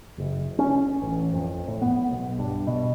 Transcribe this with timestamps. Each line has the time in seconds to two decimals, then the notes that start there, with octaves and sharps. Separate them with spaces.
0.18 F#1
0.59 C#4
1.02 A1
1.34 F2
1.68 A2
1.82 B3
2.11 B1
2.39 G2
2.67 B2